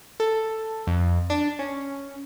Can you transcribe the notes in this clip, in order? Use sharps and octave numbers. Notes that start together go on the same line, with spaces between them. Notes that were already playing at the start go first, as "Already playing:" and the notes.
A4
F2
D4
C#4